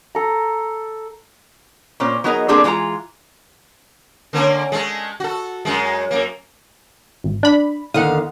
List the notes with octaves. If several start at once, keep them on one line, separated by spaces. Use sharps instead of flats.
A4 A#5
A#2 C#4 C5
F#3 B3 D#4 G#4 A#4 D#5
G3 A#3 C4 D4 G#4 A4
E3 G#3 F4 C#5 A#5
D3 A#3 C#4
G#3 A3
F#4 A4
F#2 G#3
F#2 A#3
G#1
D4 B5
D#2 D3 F5 F#5 D#6